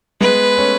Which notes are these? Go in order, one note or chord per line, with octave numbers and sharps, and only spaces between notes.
G#3 B3 B4
A3 C#4